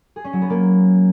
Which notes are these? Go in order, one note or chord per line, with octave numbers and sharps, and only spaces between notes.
G#4
C#4
F#3
B3
A#3